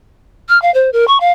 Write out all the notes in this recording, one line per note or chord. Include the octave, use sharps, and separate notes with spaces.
F6
F5
C5
A#4
C#6
F5